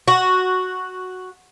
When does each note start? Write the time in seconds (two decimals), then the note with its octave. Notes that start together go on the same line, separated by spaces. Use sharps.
0.08 F#4